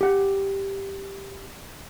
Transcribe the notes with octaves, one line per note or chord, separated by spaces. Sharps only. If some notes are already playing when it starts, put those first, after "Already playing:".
G4 F#5